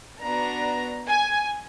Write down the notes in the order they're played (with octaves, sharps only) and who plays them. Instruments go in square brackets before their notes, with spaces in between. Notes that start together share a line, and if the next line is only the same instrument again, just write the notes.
[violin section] B3 D4 F#4 A#5
G#5